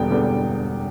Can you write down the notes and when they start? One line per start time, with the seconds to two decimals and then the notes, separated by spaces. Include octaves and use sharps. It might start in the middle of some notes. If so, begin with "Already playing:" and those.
Already playing: E1 E2 D3 G3 B3 G5
0.10 E1 E2 D3 G3 B3